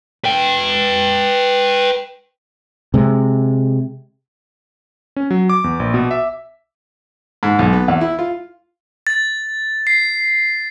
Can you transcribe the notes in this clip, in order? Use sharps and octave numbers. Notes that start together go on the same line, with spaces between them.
B4 G5
C3 G#3
C#4
F#3
D6
E2
A#1
B2
E5
G#2
B1
B3
E2
E4
F4
A6
C7